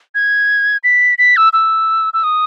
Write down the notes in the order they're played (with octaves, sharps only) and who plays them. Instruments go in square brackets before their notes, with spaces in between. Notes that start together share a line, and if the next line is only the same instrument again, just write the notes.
[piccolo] G#6
B6
B6
E6
E6
E6
D#6